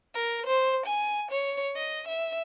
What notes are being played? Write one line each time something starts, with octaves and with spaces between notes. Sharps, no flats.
A#4
C5
G#5
C#5
D#5
E5